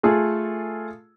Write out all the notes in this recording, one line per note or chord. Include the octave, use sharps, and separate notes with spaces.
A3 F4 G#4 A4